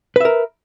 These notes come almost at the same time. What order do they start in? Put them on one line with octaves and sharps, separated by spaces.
B4 E5 A#4